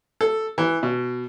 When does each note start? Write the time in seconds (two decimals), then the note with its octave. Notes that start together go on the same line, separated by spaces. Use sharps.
0.21 A4
0.58 E3
0.83 B2